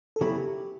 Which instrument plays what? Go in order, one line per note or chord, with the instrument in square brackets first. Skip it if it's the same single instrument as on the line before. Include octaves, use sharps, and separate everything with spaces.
[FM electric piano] A4
[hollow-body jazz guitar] C#3 F#3 B3 E4 [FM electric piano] G4